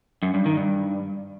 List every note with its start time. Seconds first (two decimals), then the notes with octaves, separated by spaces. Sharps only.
0.23 F#2
0.34 G2
0.46 D#3
0.57 G2